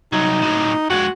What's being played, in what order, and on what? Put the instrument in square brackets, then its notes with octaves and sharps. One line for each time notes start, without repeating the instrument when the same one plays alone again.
[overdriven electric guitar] C2 F#3 [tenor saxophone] D#4
[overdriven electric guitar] A2 F#3
[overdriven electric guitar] F2 G#3 [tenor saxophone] F#4